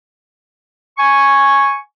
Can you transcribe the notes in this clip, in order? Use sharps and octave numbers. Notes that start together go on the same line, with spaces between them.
G#5 C#6